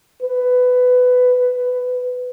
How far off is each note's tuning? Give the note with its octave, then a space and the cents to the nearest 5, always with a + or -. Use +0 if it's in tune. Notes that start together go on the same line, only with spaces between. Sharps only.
B4 +15